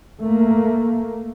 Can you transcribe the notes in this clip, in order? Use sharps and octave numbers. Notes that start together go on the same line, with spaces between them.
A3 A#3